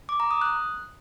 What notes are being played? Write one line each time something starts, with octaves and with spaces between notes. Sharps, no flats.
D6
A#5
D#6
F#6